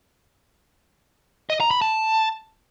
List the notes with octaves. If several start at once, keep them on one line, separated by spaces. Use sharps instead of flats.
D#5
A#5
B5
A5